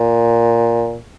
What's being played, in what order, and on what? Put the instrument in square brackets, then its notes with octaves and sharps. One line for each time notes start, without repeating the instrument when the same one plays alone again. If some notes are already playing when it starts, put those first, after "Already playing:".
Already playing: [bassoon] A#2